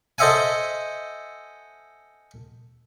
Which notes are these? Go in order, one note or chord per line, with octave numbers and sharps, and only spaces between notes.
A4 C5 D#5 E5 F#5 G#5